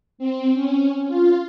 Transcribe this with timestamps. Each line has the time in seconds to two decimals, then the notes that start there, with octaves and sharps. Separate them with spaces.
0.18 C4
0.54 C#4
1.08 F4